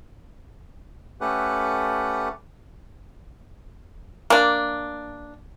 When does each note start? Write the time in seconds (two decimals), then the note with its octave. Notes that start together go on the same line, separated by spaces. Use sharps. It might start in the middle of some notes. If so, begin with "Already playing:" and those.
1.21 A3 C#4 G4 A4 B4 F#5
4.30 A#3 D4